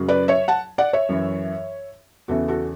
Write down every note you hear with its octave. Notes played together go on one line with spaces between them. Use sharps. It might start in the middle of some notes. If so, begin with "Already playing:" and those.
Already playing: F#2 C#3 F#3
B4 D5
C#5 E5
F#5 A5
D5 F#5
C#5 E5
F#2 E3
E2 C#3 E3 F#4 A4
F#4 A4